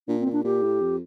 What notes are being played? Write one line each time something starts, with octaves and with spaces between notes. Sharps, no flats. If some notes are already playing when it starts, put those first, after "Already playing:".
A#2 D4
C4
A#2
D4
A#2 G4
A2
F2